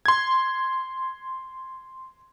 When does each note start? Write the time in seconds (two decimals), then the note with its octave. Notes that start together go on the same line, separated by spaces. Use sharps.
0.06 C6 G#6